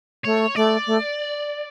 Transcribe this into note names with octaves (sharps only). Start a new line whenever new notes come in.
A3 C#5
A3 D5
A3